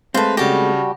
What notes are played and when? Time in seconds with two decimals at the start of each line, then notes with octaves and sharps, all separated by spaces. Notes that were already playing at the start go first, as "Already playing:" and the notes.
0.14 G#3 A3 C4 B4 C5 F5 A5
0.37 C#3 G3 F#4 G4 A5 A#6